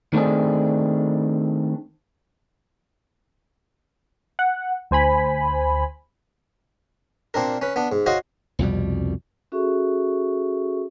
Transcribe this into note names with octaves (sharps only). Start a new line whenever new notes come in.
D#3 A3 C4 D4 G#4
F#5
D2 C5 G#5 B5
A#2 C4 D4 A#4
C#4 B4
B3 D4
G#2
F#4 C5 C#5 D#5 F5
C2 F2 B2 G3
C#4 F#4 G#4 A4 E5 C#6